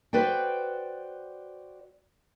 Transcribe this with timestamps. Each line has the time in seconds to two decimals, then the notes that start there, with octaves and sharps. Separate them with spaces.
0.13 F#4 B4 C5 D5 G5